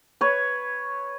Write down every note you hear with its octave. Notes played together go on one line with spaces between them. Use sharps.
B4 C#5